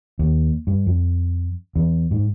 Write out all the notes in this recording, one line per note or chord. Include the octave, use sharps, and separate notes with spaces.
D#2
G2
F2
E2
G#2